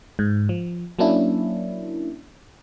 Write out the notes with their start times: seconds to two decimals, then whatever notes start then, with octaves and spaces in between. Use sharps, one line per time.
0.19 G#2
0.49 F3
0.99 F#3 A#3 C#4 D4 E4